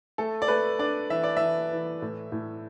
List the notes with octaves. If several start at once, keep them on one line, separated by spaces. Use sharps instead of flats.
A3 A4
D5
A3 B4
D4 D5
E3 E5
D5
E3 E5
E3
A2
A2